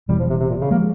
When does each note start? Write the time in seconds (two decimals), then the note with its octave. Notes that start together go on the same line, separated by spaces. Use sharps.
0.09 E1 E2 E3 G3
0.19 F3
0.30 C3
0.40 C3
0.50 A#2
0.61 C#3
0.71 F3 G#3 A#3